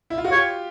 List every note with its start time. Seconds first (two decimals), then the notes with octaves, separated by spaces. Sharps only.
0.10 E4
0.18 F4
0.24 F#4
0.32 F4 G4 C#5